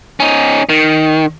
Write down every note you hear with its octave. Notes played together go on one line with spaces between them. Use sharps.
C#4 D#4
D#3